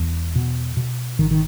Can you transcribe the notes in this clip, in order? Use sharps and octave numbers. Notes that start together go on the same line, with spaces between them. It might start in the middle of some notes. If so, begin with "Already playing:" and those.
Already playing: E1 E2
B2
B2
G#1 D#3
D#3